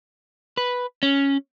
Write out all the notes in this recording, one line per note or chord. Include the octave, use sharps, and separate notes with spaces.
B4
C#4